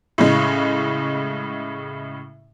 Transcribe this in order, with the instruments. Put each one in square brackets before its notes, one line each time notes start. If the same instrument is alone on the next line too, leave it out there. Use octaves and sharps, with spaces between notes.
[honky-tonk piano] A2 C#3 G#3